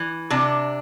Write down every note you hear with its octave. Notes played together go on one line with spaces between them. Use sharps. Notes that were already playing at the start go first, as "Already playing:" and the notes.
Already playing: E3
C3 D4